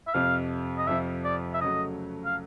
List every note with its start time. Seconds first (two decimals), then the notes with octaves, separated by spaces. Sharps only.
0.07 E5
0.13 F2 C3 F3 F5
0.78 D#5
0.87 F2 C3 F3 E5
1.25 D5
1.54 E5
1.61 C#3 F#3 A3 D#5
2.25 F5